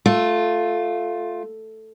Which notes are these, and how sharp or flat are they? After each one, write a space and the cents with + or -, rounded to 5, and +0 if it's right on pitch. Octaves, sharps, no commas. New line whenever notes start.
A3 +0 F4 +10